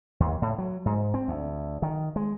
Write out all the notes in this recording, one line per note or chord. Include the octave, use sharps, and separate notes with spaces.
D#2
A2
F#3
G#2
C4
D2
D#3
G#3